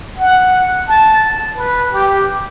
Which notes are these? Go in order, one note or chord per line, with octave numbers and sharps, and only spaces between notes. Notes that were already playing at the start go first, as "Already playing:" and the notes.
F#5
A5
B4
G4